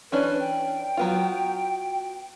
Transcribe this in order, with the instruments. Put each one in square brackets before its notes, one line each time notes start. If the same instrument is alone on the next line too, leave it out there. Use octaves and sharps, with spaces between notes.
[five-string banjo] E3 C#4 D4 [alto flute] B4
[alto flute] G5
[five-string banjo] F#3 B3 F4